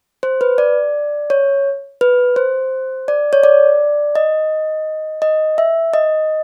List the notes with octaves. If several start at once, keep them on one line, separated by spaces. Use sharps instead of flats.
C5
B4
D5
C#5
B4
C5
D5
C#5
D5
D#5
D#5
E5
D#5